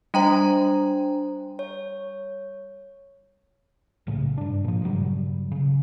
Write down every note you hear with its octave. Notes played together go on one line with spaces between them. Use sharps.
G3 D4 C5 G5 A#5
C#5
B1 A2 C#3
G2 D4
A#2 F3
G2 C#3 F#3 G3
C#3